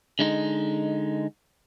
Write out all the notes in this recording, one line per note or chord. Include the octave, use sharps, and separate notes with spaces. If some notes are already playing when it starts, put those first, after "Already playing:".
D3 G#3 D#4